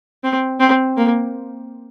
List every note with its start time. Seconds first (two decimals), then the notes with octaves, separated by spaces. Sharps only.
0.23 C4
0.60 C4
0.97 A#3